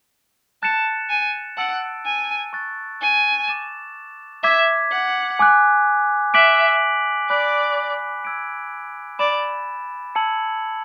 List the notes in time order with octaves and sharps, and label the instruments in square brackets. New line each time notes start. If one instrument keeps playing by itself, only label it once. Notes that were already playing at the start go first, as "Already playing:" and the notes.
[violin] A5 [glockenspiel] F#6 A6 C#7 E7
[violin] G#5
[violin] F#5 [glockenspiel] A5 E6 A6 D7
[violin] G#5
[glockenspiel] C#6 F#6 A6
[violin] G#5
[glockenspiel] D6 A6 E7
[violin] E5 [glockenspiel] D6 G#6 B6
[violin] F#5
[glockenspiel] G#5 D6 F#6
[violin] E5 [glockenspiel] D6 F#6 B6 D7 F#7
[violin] D5 [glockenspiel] B5 F#6 B6
[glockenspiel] E6 G#6 D7
[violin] D5 [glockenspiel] B5 D6 A6 E7
[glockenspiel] A5 E6 G#6 C#7 F#7